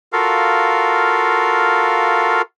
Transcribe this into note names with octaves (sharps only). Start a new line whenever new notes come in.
F4 F#4 A4 A#4 F5